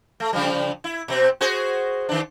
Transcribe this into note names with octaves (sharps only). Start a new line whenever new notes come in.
A3
C#3 F3 G3
E4
B2 C4
F#4 G#4 C5
D#3 D4